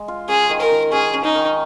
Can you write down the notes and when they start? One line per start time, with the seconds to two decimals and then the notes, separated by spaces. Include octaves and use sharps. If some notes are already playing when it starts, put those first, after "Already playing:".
Already playing: G#3
0.08 F4
0.28 C#4 G#4
0.49 D#3
0.61 A#4
0.71 D#3
0.92 C#4 G#4
1.14 C#4
1.24 D#4
1.35 D#3